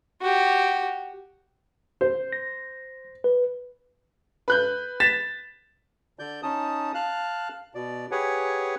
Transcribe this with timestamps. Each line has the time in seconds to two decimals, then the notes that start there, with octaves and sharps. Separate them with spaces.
0.21 F#4 G4
2.01 C5
2.33 A#6
3.24 B4
4.48 B4 F#6 G6
5.00 A6 B6 E7
6.19 D3 D5 G6
6.43 C#4 D#4 A5 D#6
6.94 F5 A5 F6 F#6
7.75 B2 D5
8.11 G4 G#4 B4 C#5 F#5 G#5